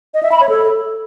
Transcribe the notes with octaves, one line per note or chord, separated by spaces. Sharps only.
D#5
E5
B5
C#5
A4